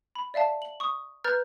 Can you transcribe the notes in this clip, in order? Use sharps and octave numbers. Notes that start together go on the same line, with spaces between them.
B5
D5 E5 F5 A5
F#7
C#6 D#6
B4 A#5 F6 G6 A6